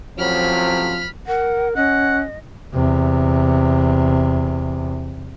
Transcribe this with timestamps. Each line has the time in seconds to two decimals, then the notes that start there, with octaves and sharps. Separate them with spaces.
0.18 A1 F3 F#3 C4 B5 F6
1.27 A#4 F#5
1.76 C#4 D#5 F#5
2.74 E2 C3